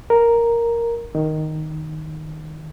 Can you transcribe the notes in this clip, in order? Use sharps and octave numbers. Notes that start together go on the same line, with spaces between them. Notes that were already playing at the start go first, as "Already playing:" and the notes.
A#4
D#3